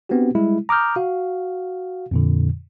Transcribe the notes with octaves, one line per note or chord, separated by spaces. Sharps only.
B3 C4 D4 F#4 G4
G3 G#3 E4
A#5 D6 D#6 F6 G6
F#4 F5
F2 A#2 D3